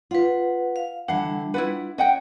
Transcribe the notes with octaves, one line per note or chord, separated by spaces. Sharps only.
F4 B4 F#5
F5
D3 E3 G3 D4 F#5
E4 F4 B4 F#5
C#4 D#5 F#5 G5